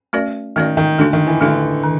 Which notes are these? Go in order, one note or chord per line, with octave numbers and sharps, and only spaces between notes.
A3 C#4 F#4 A#4 D5
D#3 A3 C#4 F#4 A#4 D5
D#3
D3 A3 D4 F#4
D#3
E3
D3 A3 D4 F#4
D#3